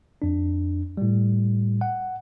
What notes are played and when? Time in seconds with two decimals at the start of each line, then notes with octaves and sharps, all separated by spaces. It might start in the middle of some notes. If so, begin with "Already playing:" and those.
0.22 F2 D4
0.97 A2 G3
1.81 F#5